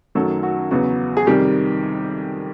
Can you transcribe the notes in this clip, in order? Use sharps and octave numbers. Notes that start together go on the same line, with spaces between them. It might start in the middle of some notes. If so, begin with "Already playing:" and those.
F#2 D#3 F#3 A3 A4
F#4
E2 C#3 F#3 B3 F#4
G#4
F2 C3 D#3 G3 G4